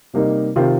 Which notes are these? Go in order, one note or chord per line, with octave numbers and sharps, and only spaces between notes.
C3 G3 A#3 D#4
C3 D#3 C4 F4